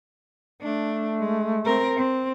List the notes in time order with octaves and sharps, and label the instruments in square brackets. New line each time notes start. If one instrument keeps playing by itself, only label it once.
[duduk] A3 [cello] D4
[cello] G#3
C4 A#4
C4